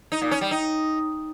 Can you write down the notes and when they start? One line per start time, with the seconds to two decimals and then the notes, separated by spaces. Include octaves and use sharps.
0.12 D#4
0.22 A#2
0.31 C#4
0.41 G3
0.51 D#4